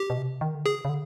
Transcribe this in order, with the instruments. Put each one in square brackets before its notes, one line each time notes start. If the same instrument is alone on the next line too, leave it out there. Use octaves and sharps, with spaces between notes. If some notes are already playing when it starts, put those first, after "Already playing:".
Already playing: [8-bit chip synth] G4
[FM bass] B2
C3
D#3
D3
[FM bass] C#3 [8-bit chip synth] G#4
[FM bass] C#3
D3